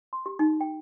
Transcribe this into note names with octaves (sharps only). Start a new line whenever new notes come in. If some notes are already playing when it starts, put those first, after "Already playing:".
C6
G4
D#4
G5